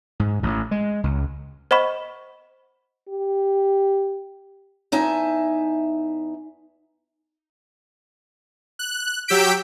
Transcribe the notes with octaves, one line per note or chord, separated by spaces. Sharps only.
G#2
A1
G#3
C#2
C5 D#5 F#5 B5 C#6
G4
E2 D#4 E5 G#5 A5
F#6
F#3 G4 E6 G6 B6 D7